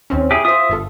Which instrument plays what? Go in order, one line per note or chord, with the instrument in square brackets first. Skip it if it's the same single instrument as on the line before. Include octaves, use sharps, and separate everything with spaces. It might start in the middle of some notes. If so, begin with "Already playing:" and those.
[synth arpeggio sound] D#2 C4 C#4
[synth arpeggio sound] E4 [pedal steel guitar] G4 G#4
[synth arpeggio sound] F4 C5 [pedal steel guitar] E5 D#6
[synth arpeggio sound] G1 F4 A4